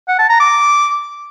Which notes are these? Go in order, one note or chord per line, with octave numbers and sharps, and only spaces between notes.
F#5
A5
A#5
D6